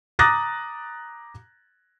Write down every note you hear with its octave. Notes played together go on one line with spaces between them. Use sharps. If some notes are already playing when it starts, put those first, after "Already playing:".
A#5 D6 D#6 F#6 A6 A#6